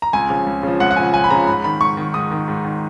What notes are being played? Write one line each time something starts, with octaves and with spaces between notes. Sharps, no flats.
A#5
C#2 G#5
C#3 F3
C#2
C#3 F3
C#2 F#5
F#5
C#3 F3 G#5
C#2 G#5
B5
C#3 F3 A#5
G#2 B5
D#3 B5
G#2 C#6
D#3
G#2 D#6
D#3
G#2
D#3